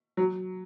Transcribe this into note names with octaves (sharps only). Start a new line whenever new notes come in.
F#3